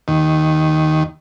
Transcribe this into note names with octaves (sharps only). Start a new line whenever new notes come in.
D#2